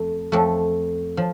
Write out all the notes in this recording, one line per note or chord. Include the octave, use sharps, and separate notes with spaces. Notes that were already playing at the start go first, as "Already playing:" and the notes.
Already playing: F2 A3 A4
F2 F3 A3
F3